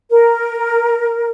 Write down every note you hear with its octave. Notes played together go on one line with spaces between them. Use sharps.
A#4